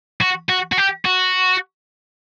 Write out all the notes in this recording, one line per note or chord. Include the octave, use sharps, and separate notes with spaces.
F#4
F#4
F#4
G4
F#4